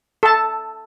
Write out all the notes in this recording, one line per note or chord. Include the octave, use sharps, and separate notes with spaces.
A4 A5